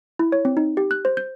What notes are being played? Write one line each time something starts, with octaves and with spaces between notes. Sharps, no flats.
E4
C#5
C4
D#4
G4
F#6
C5
G6